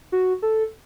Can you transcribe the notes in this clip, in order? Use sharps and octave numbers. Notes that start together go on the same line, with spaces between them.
F#4
A4